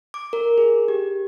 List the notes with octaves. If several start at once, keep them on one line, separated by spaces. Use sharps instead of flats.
D6
A#4
G#4
G4